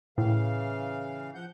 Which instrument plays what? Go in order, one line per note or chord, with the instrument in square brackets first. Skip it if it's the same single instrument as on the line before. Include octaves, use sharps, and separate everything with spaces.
[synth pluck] A2 [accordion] C#3 E3 F5
[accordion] F3 F#5 G6